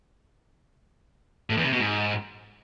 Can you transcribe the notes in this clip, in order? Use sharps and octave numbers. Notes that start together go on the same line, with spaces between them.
A2
E2
C3
B2
G#2